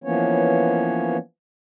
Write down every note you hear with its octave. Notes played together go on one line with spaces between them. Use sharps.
E3 F3 A#3 B3 C#4 C#5